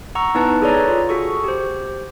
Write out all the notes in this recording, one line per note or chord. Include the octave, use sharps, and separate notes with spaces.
F#5 A#5 C#6 E6
B3 D#4 E4 B4 A5
G#4 A4 B4 C#5 D5 A#5
F4
F#4 G#4 A4 C#6
G4 C5